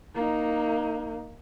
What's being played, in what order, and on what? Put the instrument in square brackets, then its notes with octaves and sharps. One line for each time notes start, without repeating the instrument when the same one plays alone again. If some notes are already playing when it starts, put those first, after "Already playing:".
[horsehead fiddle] A#3 D#4